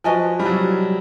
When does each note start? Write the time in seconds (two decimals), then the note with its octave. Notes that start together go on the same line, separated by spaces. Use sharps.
0.04 F3 F#4 B4 D#5 G#5
0.39 G3
0.45 F#3